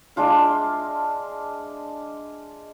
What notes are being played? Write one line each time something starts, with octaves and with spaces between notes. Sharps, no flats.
G#3 D4 F4 E5